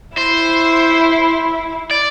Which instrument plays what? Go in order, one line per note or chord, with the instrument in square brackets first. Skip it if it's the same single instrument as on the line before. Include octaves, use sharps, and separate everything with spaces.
[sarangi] E4 [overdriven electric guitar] C5
[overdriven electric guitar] D5